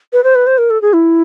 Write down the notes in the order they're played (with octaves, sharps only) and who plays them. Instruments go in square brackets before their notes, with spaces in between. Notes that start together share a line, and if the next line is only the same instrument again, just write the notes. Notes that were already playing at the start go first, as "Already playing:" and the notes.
[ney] B4
C5
B4
C5
A#4
A4
G#4
E4